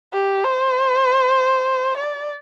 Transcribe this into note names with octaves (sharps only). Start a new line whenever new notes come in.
G4
C5
D5